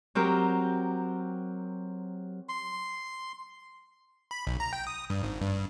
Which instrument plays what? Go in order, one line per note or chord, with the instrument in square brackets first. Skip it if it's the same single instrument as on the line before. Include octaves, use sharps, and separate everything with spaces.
[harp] F#3 C4 G4 A#4
[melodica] C6
[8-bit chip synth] B5
B1
A#5
G5
D#6
G2
G#1
G2